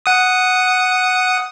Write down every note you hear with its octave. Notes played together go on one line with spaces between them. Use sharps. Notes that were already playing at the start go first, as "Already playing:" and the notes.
F#5 D#6